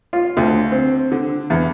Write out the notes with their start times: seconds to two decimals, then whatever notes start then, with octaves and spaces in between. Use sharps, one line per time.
0.13 F4
0.37 D2
0.72 C4
1.12 D3
1.50 E2